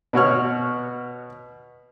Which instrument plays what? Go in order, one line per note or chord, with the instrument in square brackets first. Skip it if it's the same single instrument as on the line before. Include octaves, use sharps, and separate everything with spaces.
[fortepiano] B2 F#4 C#5 F6